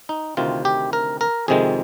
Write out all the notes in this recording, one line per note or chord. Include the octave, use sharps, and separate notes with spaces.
D#4
D2 C3 D#3 F4
G4
A#4
A#4
F2 C3 D#3 G#3 G#4